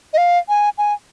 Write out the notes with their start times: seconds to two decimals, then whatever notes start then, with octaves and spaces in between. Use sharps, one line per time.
0.13 D#5
0.18 F5
0.49 G#5
0.78 G#5